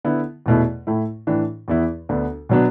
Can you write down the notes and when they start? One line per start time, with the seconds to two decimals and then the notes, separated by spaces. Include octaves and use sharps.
0.04 D3 B3 E4
0.46 E2 B2 A3 E4
0.87 A2 A3 E4
1.27 A2 E3 D4
1.68 E2 E3 B3 E4
2.09 D2 D3 B3 D4
2.49 B2 F#3 B3 D4